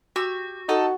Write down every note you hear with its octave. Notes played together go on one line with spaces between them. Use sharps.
F#4 G4 E6
D#4 F#4 A4